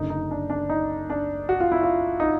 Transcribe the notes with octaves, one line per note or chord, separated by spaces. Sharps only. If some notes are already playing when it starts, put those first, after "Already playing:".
Already playing: F#1 F#2 D3 D#4
D#4
D4
D4
D#4
D4
F#4
F4
E4
F4
D#4